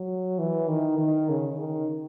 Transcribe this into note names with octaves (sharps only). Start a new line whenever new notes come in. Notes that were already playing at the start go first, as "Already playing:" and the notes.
Already playing: F#3
E3
D#3
D#3
C#3
D#3